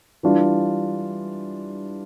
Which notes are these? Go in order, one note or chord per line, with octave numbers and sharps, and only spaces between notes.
E3 G3 D4 F4